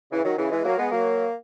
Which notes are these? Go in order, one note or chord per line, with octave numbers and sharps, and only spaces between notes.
C#3 E3
D#3 F#3
C#3 E3
E3 G#3
F#3 A#3
G#3 B3
F#3 A#3